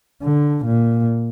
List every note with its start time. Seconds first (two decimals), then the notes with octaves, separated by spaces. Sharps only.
0.22 D3
0.66 A#2